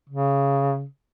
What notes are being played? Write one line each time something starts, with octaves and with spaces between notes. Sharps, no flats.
C#3